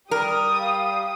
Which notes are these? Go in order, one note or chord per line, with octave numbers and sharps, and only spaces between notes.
G3 G4 A#4 D#6
F5